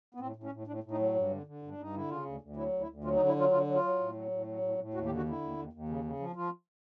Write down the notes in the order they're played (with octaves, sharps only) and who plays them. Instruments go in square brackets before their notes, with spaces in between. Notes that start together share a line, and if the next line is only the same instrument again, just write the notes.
[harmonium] B3
A2 C4
A2
C#4
A2
A2 D4
A2
D#4
F#3
G2
D3
D3
G2
D4
G2 D#4
D3 E4
C#3 F4
D2
D2
F#3 E4
D2
E4
D2
F#3 F4
D#4
D3
E4
F#3 F4
D3 F4
F#3
F4
F#3
A2
F#3
A2
F#3
A2
A2
D#2 F#4
G4
D3
F#4
D3 E4
D#2
D#2
D#2
C#3
C#3
F3
F3 F4